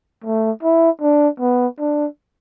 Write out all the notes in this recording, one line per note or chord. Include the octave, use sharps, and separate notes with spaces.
A3
E4
D4
B3
D4